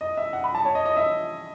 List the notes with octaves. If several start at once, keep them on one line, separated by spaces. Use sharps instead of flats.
D#5
E5
F#5
B5
A5
C#5
D#5
D#5
E5